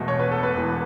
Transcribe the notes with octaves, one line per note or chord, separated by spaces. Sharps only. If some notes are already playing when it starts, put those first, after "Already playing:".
Already playing: E1 E2 B2 A3
C#5
B4
A4
B4
E1 E2 E3